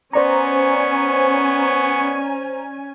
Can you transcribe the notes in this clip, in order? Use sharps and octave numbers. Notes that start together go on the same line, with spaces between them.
B3 C#4 C5 D5 G#5 A#5 C#6